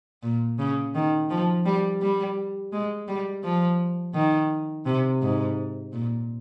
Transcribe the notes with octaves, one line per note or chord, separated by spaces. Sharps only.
A#2
C#3
D#3
F3
G3
G3
G#3
G3
F3
D#3
C3
G#2
A#2